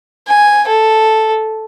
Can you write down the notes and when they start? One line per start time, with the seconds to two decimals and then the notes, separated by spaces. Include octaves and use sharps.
0.27 G#5
0.68 A4